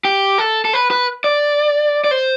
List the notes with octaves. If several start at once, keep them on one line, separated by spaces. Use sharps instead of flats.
G4
A4
A4
B4
B4
D5
D5
C5